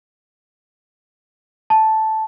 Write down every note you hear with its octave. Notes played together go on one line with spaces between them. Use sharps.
A5